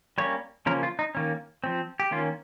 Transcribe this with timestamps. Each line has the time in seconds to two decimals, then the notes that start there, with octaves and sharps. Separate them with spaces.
0.18 G3 A#3 C#4 C#5
0.66 C#3 F3 A#3 C#4 A#4
0.83 F4
0.99 D#4
1.15 D#3 A#3 C#4
1.64 F3 C4
2.00 G4
2.11 D#3 A#3 C#4 F4